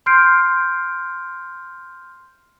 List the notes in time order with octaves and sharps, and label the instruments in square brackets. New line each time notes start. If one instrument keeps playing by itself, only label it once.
[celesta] C6 F6 G6 C7 D7